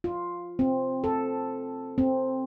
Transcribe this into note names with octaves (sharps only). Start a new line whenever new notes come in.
F4
C4
A4
C4